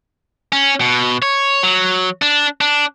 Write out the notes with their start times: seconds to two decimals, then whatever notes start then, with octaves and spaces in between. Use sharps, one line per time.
0.52 C#4
0.81 B2
1.22 C#5
1.63 F#3
2.22 D4
2.61 D4